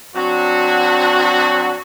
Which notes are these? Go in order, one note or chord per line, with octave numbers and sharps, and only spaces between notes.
F#3 C4 D4 F#4